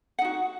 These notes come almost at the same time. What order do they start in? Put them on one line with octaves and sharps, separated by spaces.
F#5 D#4 F#4